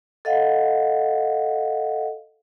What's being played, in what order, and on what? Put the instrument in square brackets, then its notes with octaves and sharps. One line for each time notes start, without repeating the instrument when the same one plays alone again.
[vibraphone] A4 D#5 F5 F#5